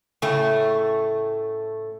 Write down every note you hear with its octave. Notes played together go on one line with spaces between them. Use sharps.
A2 C#3 A3